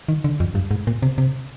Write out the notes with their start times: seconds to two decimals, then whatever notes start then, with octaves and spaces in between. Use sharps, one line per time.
0.09 D#3
0.24 D3
0.40 F2
0.55 G2
0.71 G#2
0.87 A#2
1.02 C3
1.18 C3